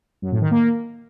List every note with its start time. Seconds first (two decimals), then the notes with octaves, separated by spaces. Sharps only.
0.22 F#2
0.32 A2
0.42 D#3
0.51 A#3